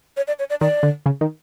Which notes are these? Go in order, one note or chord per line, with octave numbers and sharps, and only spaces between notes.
C#5
D5
C#5
D5
D#3 D5
D3
C#3
D#3